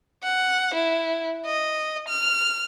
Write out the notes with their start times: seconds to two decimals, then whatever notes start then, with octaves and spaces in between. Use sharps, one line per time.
0.23 F#5
0.74 E4
1.46 D#5
2.08 F6